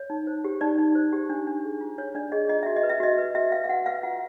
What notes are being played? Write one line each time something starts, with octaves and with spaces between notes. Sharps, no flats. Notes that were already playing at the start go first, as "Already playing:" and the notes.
Already playing: C#5
D#4
C5
G4
D#4 D5
D#4
C5
G4
D4
D4
G#4
F4
D4 C#5
D4 D5
G#4 D#5
F4 D#5
F#4 E5
D#5
B4
E5
F#4 D#5
B4
F#4 E5
B4 F5
F5
F#4 F#5
B4 F5
F4 F#5